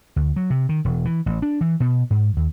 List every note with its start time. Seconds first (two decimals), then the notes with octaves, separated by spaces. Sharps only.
0.16 D2
0.36 F#3
0.50 C3
0.69 D#3
0.85 E1
1.05 E3
1.26 A1
1.42 D4
1.61 E3
1.80 B2
2.10 G#2
2.37 D#2